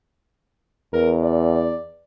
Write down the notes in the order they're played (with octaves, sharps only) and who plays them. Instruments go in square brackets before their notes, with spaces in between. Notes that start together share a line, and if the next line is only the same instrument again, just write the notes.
[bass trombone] E2 [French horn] A#4
[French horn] D5